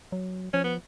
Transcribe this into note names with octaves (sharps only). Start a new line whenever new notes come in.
F#3
F3 C#4
B3